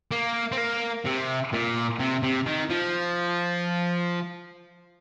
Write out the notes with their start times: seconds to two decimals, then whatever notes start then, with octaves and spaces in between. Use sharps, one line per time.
0.11 A#3
0.52 C4
0.57 A#3
1.05 C3
1.53 A#2
1.99 C3
2.23 C3
2.47 D#3
2.70 F3